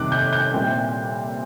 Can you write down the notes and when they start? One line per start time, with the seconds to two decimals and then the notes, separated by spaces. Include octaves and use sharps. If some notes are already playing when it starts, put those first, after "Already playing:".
Already playing: F2 C3 D#3 G3 D6 F#6
0.12 G6
0.33 G6
0.53 A#2 G3 C4 E4